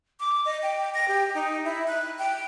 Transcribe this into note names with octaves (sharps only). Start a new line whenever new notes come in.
D6
D#5
G5
A#6
G4
D#4
E4
F#6
G5